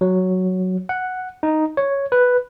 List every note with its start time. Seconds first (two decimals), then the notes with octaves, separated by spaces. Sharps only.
0.01 F#3
0.89 F#5
1.43 D#4
1.77 C#5
2.12 B4